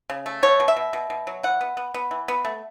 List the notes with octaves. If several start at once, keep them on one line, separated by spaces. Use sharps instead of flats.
C#3
A3
B2 C#5
B2
E5
B2
B2
B2
F#3
E3 F#5
B3
B3
B3
E3
B3
A3